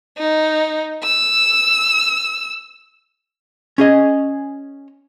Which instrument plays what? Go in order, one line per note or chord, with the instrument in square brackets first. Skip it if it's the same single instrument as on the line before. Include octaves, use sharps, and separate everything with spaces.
[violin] D#4
E6
[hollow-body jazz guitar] C#4 G#4 D#5